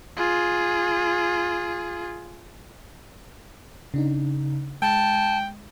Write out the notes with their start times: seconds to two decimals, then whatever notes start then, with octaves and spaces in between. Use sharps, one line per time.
0.17 F4 G#4
3.94 C#3 D4 D#4
4.82 G#3 G5 A5